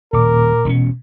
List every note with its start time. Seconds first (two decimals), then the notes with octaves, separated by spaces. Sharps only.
0.13 D#1 A#2 A#4 D6
0.65 E1 B2 C4 C#4